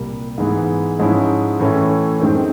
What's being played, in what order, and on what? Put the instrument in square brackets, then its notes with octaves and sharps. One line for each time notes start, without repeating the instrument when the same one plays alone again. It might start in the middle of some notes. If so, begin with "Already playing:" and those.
Already playing: [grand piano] C2 A#2 G3 A#3
G#2 E3 G#3 B3
G#2 F3 G#3 C#4 E4
A2 E3 A3 C#4
F#2 D#3 G#3 C4